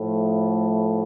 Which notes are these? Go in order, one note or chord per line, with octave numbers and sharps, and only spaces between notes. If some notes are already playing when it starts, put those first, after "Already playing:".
Already playing: A2 F3 A3